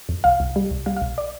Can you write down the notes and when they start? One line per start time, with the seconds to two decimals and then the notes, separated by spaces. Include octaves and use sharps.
0.09 F2
0.24 C2 F5
0.40 C2
0.56 G3
0.71 C2
0.86 G3 F5
0.97 F5
1.02 B1
1.18 D5